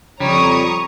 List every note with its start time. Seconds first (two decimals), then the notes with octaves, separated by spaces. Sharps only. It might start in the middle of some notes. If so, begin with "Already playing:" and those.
0.20 F2 C#3 F3 G3 C#5 A#5 C#6 D#6